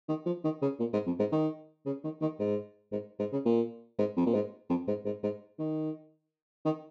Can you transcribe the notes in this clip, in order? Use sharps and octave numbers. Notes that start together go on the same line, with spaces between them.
D#3
F3
D#3
C#3
A#2
G#2
F2
G#2
D#3
C#3
D#3
D#3
G#2
G#2
G#2
C#3
A#2
G#2
F2
A#2
G#2
F2
G#2
G#2
G#2
D#3
D#3